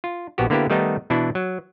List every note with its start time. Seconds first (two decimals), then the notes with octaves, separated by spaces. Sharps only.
0.04 F4
0.38 A#1 B3 F#4 G4
0.50 D3 A#3 B3 E4 G4
0.70 D#3 G3 A3 B3 D#4
1.10 B2 E3 D4 E4
1.35 F#3